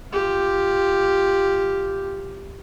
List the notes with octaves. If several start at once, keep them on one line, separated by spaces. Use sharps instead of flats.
F4 G4